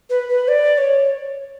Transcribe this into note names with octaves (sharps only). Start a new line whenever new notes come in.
B4
B4
D5
C#5